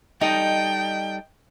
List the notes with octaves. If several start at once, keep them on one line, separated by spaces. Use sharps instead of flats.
G3 D#4 A4 D#5 G5